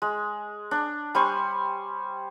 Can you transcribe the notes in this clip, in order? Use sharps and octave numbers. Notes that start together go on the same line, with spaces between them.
G#3
D4
G3 C5 G#5 C#6